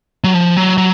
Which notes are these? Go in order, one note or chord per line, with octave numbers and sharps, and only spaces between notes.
F#3
F3
F#3
F#3